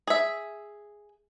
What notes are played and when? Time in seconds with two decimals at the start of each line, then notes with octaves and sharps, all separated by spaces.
0.07 G#4 E5